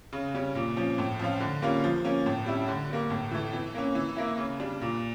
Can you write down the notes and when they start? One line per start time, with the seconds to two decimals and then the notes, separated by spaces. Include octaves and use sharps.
0.13 C#3
0.34 G3 C#4
0.55 A#2
0.77 F3 C#4
0.98 A2
1.19 F3 C#4 F4
1.40 D3
1.62 G3 A#3 C#4 F4
1.84 F3
2.05 A#3 C#4
2.26 A2
2.46 G3 C#4 E4
2.68 D3
2.89 G3 A#3
3.10 A2
3.31 E3 A3
3.53 E3
3.75 A#3 C#4
3.95 E3
4.17 A#3 E4
4.38 C#3
4.60 G3 D4
4.81 A#2